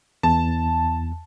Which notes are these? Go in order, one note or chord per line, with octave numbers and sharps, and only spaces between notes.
E2 A5